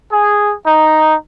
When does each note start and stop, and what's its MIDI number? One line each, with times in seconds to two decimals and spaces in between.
0.11 0.53 68
0.66 1.14 63